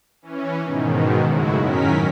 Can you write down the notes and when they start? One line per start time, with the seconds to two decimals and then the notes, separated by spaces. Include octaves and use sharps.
0.22 E3 C#4
0.62 G#2 B2 D#3
1.24 F#2 A2 C#3 G#3 E4 F#4
1.59 D#3 F#3 C#4 A#4 B6